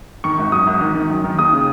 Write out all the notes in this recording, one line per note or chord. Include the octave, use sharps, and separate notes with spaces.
D#3 C#6
G#1
F#2 D#6
G#1
D#3
D#3
F#2
D#3
D#2 D#6
C#3